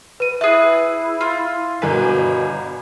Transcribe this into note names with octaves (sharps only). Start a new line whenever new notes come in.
B4 D#7
E4 G#4 E5 F#6
F4
G1 B2 A#4 B4 G#5